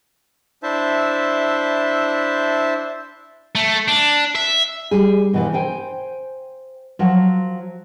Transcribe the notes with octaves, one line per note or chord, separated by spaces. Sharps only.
D4 E4 C5 E5 A5
A3
D4
E5
G3 G#4
B2 E3 F3
C5 G5 G#5
F3 F#3